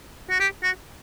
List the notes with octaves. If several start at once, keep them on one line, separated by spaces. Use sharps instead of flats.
F#4
G4
F#4